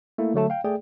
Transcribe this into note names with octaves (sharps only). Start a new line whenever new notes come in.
A3 A#3 E4
D3 F#3 A3 A5
F5 G5
A3 G#4 D5 G5